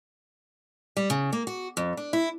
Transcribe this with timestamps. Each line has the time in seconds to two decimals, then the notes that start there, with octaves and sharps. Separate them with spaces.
0.97 G3
1.10 C#3
1.33 A#3
1.47 F#4
1.77 F2
1.97 D4
2.13 E4